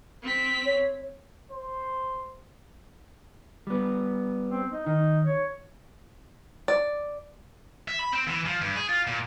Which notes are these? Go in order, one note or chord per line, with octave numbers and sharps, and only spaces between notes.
C4 B6
C#5
C5
G3 B3
C4
D#4
D#3 D#4
C#5
D5
E5
B5
C4
E3
F3
G2
G#4
F4
A#2